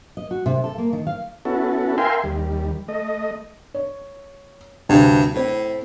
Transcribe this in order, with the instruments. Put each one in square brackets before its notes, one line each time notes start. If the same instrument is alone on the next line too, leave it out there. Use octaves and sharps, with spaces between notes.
[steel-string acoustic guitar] D#5
F#4
C3
A4
A#3
D#3
F5
[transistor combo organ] B3 C#4 E4 F#4 A4
A#4 E5 F5 G5 G#5 C6
D#2 G3
A3 D#5
[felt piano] C#5
[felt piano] D2 C3 [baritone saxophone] G2
[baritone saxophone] A2 [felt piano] C4 E4